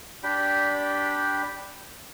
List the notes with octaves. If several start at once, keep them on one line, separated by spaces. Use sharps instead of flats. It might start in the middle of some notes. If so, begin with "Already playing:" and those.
D4 G4 G5 B5